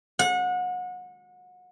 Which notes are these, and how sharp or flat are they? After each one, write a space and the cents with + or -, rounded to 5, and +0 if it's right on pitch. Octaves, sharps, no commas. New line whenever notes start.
F#5 -30